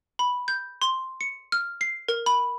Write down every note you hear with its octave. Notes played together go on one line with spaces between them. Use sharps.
B5
G6
C6
C#7
F6
C7
A#4
B5